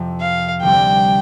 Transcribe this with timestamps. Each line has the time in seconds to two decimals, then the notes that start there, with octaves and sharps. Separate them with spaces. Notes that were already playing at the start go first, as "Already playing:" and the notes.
Already playing: F2 C3 F3
0.20 F5
0.63 D2 C3 G3 C4 G5